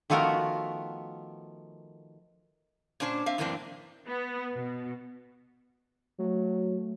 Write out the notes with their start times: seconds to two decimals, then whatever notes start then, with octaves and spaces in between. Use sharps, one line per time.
0.10 D#3 F3 A3 B3 F#4 A#4
3.00 A#2 C#4 D4 C5 C#5
3.26 C4 E5 F5
3.38 F#2 A2 E3 A#3 C4 D4
4.08 B3
4.54 B2
6.19 F#3 A3